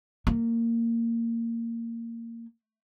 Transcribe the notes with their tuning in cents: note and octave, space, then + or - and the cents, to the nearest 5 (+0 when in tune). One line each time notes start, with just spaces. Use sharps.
A#3 -15